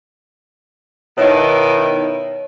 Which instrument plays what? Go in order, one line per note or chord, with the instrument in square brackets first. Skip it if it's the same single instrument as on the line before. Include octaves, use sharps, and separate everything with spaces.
[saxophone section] B2 D#3 E4 [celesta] C#5